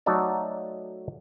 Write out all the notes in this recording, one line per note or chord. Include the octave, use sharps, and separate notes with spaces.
F#3 A3 D#4 F#4 A4 D5